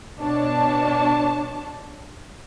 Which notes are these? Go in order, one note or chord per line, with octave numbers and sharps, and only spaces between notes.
B2 D4 C#5 A5